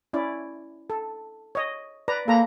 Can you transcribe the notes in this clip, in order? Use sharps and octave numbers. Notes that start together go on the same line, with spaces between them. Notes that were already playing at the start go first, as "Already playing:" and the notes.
C#4 E4 D5
A4
C#5 D#5
B4 D5 A#5
A#3 A4 A#5 B5